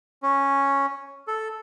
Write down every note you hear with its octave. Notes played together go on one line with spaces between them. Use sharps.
C#4
A4